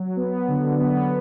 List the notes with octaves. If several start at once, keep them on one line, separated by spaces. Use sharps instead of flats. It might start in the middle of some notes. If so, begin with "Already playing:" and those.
Already playing: F#3
B3
D3
B3